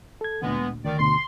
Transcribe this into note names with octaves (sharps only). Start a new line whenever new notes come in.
A4 G#6
D2 A#2 D3 E3 G#3 B3
D2 D#3 D5
D2 B2 D3 C6